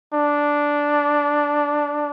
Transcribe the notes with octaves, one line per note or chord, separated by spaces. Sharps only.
D4